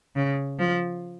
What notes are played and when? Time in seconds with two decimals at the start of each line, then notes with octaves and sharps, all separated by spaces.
0.16 C#3
0.59 F3